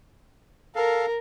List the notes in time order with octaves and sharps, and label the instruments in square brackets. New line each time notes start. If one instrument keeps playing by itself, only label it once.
[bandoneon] A4 F5 [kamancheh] A#4